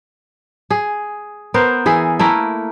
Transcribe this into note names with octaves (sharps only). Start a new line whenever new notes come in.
G#4
B3 A#4 C5
E3 G#4 E5
A3 A#3 E4 A#4